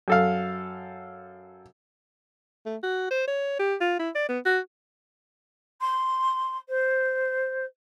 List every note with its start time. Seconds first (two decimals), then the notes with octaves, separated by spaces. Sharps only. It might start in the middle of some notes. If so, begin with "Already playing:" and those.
0.08 F#2 A4 F5
2.66 A3
2.83 F#4
3.10 C5
3.28 C#5
3.59 G4
3.81 F4
3.99 E4
4.15 D5
4.29 B3
4.45 F#4
5.81 C6
6.68 C5